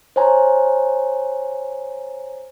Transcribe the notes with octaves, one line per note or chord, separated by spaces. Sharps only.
C5 C#5 G#5 A#5